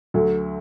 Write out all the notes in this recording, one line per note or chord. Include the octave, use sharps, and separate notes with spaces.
D2 D3 F#3